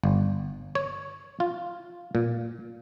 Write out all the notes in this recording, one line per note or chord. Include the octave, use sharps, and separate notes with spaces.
G1
C#5
F4
A#2